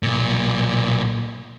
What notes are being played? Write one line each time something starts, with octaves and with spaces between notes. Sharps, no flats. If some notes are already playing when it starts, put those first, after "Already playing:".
B1 A#2